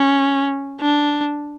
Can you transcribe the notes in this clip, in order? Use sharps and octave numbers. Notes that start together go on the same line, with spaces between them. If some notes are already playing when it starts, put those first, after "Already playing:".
Already playing: C#4
D4